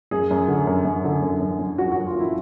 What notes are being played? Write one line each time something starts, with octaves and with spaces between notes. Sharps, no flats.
F#2 G#4
F#2
D3
F#2
F#2
D3
F#2
F#2
F#2
F#3 F#4
F#3 F#4
F4
F#2 E4